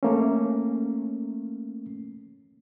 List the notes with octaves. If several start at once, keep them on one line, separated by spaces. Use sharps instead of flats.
A3 A#3 C#4